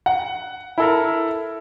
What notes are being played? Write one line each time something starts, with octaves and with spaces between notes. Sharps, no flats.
F#5
E4 A4 A#4